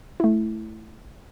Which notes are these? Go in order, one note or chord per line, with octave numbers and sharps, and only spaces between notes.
A3 E4